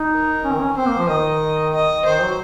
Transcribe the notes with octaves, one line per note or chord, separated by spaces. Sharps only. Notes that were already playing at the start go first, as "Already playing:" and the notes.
Already playing: D#4
A#4
C#4
D#3
C#4
C4 C5
A#3
F3
D#3 D#5
D#5
D#3 C5
F#3